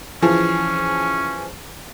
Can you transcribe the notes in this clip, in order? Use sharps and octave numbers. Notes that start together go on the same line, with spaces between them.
E3 F3 C#4 G#4